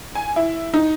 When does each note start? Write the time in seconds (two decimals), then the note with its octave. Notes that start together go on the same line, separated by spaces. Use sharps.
0.15 G#5
0.36 E4
0.74 D#4